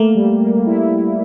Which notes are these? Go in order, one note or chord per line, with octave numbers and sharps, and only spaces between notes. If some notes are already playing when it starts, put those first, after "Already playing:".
Already playing: A3 A#3
G3
A#3
E4